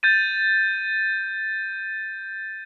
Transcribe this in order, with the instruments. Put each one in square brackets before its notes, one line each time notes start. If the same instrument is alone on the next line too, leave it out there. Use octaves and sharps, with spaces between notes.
[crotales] G6 A6 D#7